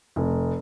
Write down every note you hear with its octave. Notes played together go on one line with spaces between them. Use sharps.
F1